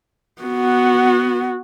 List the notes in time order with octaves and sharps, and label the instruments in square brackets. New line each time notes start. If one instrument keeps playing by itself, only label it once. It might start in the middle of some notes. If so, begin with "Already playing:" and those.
[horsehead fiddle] B3 F#4